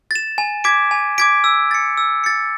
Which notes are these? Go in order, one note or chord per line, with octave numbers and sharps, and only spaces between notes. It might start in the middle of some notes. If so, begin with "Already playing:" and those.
A6 E7
G#5
D6 G#6 B6 D7
G#5
D6 G#6 B6 D7
E6
A6 C#7
E6
A6 C#7